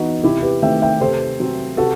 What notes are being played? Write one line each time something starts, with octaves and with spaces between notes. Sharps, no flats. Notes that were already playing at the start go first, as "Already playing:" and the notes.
Already playing: E3 B3 D#4 F#4
C3 E4 G4
G4 B4
D#3 A3 C4 E5 G5
E5 G5
C3 A4 C5
F#3 C4
C3 F#4 A4